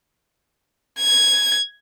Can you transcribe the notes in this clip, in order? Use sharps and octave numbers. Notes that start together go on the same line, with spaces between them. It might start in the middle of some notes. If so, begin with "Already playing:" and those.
G#6